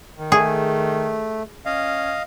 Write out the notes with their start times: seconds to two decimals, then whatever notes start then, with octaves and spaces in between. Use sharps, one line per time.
0.18 D#3
0.32 A3 G#4
1.65 C#4 D#5 F5